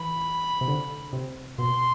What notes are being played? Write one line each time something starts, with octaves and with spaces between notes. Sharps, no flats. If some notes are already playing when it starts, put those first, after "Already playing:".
Already playing: E3 B5
C3
D3
C3
B2 C6